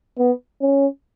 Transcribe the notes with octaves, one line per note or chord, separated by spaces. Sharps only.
B3
C#4